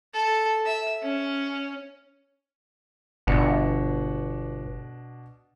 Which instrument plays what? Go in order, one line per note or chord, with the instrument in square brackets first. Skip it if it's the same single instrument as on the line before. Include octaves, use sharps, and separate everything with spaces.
[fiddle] A4
E5
C#4
[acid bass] G1 [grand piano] B2 D4 C#7